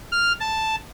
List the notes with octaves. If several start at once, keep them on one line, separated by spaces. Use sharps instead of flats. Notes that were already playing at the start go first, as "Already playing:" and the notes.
F6
A5